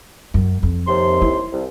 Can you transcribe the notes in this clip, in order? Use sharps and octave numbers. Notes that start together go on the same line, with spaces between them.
F#2
F2
D#2 C3 C6
E4
C2